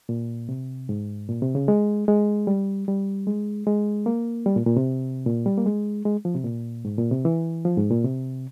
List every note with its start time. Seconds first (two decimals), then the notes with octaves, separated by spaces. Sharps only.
0.09 A#2
0.49 C3
0.89 G#2
1.29 A#2
1.42 C3
1.55 C#3
1.68 G#3
2.08 G#3
2.47 G3
2.88 G3
3.27 G#3
3.67 G#3
4.06 A#3
4.46 G3
4.56 A#2
4.66 A#2
4.77 C3
5.26 A#2
5.46 G3
5.57 A#3
5.66 G#3
6.06 G#3
6.25 F3
6.35 C3
6.45 A#2
6.85 G#2
6.98 A#2
7.11 C3
7.25 E3
7.65 F3
7.77 G#2
7.91 A#2
8.04 C3